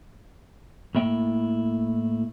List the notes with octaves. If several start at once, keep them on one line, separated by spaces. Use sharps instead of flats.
A2 A#3 E4 G5